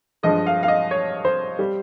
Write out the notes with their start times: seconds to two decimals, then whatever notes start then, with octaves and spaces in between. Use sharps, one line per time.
0.23 G2 F3 G#3 D#5
0.47 F5
0.63 F5
0.68 D#5
0.91 C#5
1.25 C5
1.59 G3